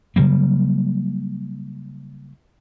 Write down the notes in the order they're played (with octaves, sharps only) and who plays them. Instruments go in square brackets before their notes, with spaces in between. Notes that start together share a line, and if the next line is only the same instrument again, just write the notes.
[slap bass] C#3 F#3 G3 A#3